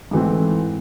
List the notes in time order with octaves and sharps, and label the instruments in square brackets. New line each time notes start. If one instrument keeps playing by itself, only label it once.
[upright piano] G#2 E3 A3 C4